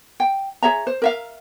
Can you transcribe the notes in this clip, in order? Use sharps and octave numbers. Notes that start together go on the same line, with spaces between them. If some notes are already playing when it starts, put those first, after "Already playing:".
G5
G#4 C#5 E5 A#5
C5
A#4 E5 F5